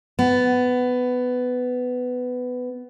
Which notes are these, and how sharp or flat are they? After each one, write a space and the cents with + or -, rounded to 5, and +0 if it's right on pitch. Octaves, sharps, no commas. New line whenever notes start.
B3 +15